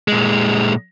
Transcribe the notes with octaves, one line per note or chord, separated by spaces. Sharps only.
A#2 G#3